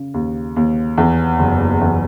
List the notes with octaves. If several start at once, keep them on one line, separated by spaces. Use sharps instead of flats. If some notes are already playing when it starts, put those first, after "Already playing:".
Already playing: C#3
D#2
D#2
E2
F#1
E2